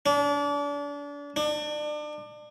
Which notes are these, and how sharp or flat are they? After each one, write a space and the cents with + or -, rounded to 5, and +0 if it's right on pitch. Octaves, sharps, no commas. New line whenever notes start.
D4 -35
D4 +30